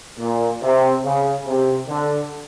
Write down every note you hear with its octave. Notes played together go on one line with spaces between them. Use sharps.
A#2
C3
C#3
C3
D3